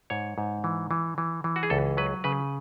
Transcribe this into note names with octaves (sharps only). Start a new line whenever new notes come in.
G#2 C#5
G#2
E3
E3
E3
E3
F#4
G#4
C#2 A4
F#3 B4
C#3 B4